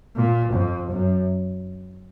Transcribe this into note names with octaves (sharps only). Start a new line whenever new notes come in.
A#2
F2
F#2